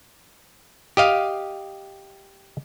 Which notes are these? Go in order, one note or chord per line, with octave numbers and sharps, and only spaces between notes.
G4 D#5 F5